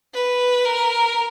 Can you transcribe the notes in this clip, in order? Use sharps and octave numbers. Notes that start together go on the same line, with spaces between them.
B4
A#4